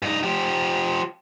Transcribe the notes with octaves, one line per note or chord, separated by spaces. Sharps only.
G2 D#4
F3 G4